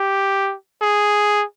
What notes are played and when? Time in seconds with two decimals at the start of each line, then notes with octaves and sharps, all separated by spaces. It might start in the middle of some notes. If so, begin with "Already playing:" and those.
Already playing: G4
0.82 G#4